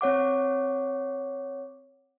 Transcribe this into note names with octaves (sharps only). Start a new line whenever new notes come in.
C4 C#5 F#5 D6